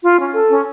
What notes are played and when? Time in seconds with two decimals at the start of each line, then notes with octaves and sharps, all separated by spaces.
0.02 F4
0.18 C#4
0.33 A4
0.50 C#4